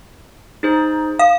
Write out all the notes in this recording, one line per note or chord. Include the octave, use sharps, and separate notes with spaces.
D#4 G#4 C5
F5